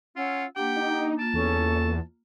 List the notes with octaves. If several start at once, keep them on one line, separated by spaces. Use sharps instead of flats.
C#4 F4 F#5 E6
A#3 D4 G4 F#5 G5
D#4
A#3 F4 A5
E2 C#4 A4 C#6